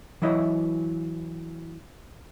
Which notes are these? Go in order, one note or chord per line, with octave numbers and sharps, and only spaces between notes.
E3 F#3 E4 D#5